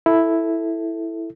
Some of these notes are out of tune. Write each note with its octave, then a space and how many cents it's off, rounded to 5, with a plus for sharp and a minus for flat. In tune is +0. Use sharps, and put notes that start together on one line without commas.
E4 +0 A4 +5